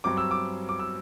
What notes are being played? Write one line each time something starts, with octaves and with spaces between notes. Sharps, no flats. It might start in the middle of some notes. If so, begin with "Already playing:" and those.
G2 F#3 C4 D6
E6
D6
D6
E6